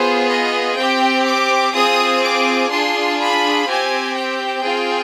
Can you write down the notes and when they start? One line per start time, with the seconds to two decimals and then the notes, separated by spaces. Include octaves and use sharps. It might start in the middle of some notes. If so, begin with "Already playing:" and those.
Already playing: B3 F4 G#4 C5
0.28 D#5
0.76 C4 G4 G5
1.24 D6
1.73 C4 F4 G#4 D#6
2.21 D6
2.70 D4 F4 G#4 C6
3.18 B5
3.66 C4 G4 G#5
4.15 G5
4.63 C4 F4 G#4